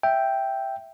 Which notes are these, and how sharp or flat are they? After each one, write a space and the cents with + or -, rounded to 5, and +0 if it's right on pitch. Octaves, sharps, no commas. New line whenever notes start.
E5 +0 G5 +0